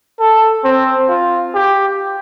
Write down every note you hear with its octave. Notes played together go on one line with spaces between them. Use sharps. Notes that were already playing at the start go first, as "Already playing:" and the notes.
A4
C4
F4
G4